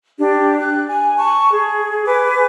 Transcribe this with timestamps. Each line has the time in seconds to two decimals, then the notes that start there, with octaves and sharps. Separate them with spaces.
0.18 D4 G4
0.60 F#6
0.88 G#5
1.18 A5 C#6
1.51 G#4
2.06 B4 G#5 D6